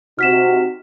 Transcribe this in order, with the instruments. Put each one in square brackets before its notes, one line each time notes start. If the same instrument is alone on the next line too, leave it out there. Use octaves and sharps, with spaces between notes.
[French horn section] C3 D#4 F#4 [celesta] F6 B6 E7